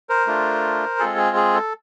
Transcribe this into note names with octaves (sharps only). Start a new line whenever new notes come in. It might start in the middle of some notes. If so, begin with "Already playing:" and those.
A#4 C5
A3 D4 F4
G#3 C4 F4 G#4 A4
G#4
G#4
A4